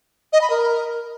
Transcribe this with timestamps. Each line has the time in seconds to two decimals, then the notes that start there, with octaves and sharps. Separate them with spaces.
0.33 D#5
0.41 B5
0.50 A#4